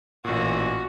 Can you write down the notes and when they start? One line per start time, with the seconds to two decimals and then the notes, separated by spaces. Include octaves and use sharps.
0.25 A1 A#2 F#4